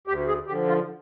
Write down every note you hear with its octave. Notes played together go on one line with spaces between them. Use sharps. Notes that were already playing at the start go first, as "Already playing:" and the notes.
D2 G4
G#4
D3 F3 G4
F4